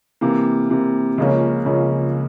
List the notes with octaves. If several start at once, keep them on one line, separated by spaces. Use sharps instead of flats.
C3 E3 A#3
C3 E3 A#3
C#2 C#3 F3 A#3 C#4
C#2 C#3 F3 A#3 C#4